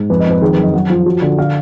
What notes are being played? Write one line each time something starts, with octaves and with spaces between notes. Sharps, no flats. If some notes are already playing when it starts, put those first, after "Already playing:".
Already playing: G#2
F2 B4
D#5
F2 B4
D#3 G#4
F#2 B4
D#5
F#2 F#5
F3
F#3
D3
D3 F5